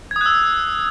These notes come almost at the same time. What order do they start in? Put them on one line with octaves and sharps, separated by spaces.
G#6 D#6 F#6 E6